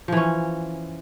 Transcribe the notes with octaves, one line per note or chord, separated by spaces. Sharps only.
E3 F3 C#4